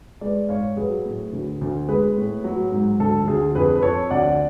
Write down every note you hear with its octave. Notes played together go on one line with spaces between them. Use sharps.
G#3 B4 D5
G#2 C#5 F5
F#3 G#4 B4
A2
D2
D2
G#3 G#4 B4
A2
F#3
G#2
D2 A4
D2 G#4
F2 G#4 B4
B4
F2 A4 C#5
D2 D5 F#5